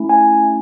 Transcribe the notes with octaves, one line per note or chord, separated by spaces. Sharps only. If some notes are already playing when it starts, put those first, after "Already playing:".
Already playing: A3 C#4 E4
G#5